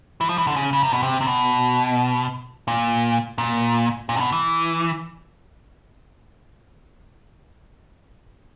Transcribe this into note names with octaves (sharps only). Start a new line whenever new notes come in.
E3
F3
E3
D3
C#3
C#3
C3
B2
C3
C3
B2
A#2
A#2
A#2
C3
B2
E3